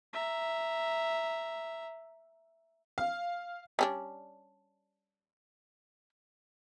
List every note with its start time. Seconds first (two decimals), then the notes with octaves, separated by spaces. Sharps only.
0.13 E5 A#5
2.98 F5
3.79 G3 C#4 D4